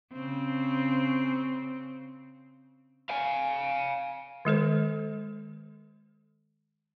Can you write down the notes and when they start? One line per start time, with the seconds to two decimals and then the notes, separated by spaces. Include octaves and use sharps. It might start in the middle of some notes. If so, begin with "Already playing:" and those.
0.13 C#3 C4
3.09 F5 G#5
4.45 D#3 G#3 A4 C5